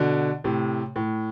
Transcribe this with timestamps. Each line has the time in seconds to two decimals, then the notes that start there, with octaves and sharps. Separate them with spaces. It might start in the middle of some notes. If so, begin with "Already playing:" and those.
Already playing: B2 D3
0.44 A2 C3
0.96 A2